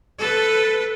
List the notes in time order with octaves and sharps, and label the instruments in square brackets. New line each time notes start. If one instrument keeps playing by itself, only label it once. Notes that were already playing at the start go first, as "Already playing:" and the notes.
[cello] A4 B4